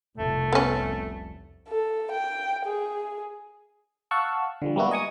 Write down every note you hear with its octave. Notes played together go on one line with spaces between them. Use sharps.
F1 C2 A3
B3 C#4
A4
G5
G#4
F5 F#5 A5 C#6 E6
D3 F3 G3
G3 G#3 A#3 B3 E4 F#4
D#5 G#5 C#6 D#6